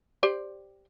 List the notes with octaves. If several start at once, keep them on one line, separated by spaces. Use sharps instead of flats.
G4 C5 D5